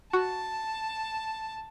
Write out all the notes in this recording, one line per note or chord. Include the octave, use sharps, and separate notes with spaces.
F#4 A5